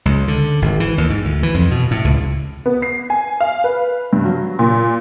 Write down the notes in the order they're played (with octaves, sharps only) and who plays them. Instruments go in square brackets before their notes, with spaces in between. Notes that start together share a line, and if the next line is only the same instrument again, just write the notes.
[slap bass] C#2
D3
G#1
E3
D#2
G#2
D2
E3
F2
B2
A2
C#2
[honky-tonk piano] B3
C7
G#5
F5
B4
G2
F#3
A#2